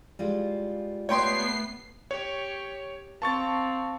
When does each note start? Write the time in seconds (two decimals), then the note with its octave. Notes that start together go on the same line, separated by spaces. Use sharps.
0.19 G3 G#3 F4
1.09 A3 B3 C#5 G5 C6 C7
2.11 G4 C#5
3.22 C4 F5 A5 C#6 A6